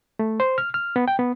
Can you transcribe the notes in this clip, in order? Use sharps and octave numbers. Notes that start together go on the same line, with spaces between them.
A3
C5
F6
F6
B3
G5
B3